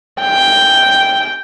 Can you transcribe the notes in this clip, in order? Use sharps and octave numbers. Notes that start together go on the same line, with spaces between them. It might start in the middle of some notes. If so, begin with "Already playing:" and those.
G5